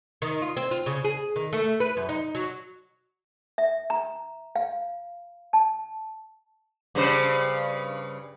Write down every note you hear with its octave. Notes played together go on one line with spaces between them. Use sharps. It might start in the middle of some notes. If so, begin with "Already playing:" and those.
D#3
F4
C4
F4
C#3
G#4
D#3
A3
B4
F#2
D#4
F#3
E5
A#5
F5
A5
G2 C#3 C5